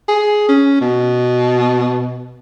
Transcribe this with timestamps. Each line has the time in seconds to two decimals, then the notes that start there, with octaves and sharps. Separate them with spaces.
0.08 G#4
0.49 C#4
0.81 B2